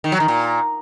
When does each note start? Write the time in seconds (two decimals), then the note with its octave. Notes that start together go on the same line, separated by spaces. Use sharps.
0.04 D#3
0.12 F#3
0.20 D#3
0.28 A#2